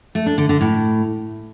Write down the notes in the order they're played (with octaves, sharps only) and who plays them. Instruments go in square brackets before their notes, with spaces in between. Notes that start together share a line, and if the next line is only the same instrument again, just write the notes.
[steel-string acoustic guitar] A3
D4
D3
D3
A2